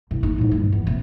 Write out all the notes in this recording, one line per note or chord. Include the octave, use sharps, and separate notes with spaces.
C2
D#4
C#2 A2
G2
E2
C3